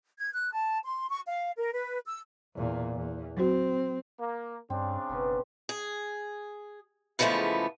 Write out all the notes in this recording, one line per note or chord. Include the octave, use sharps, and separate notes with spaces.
G#6
F#6
A5
C6
C#6
F5
A#4
B4
E6
E2 A#2
E2
F#3 C4 F#4
A#3
G2 C#3 C4 D4
F#1 B2 B3 C#4
G#4
C#3 E3 F3 G#3 A3 B3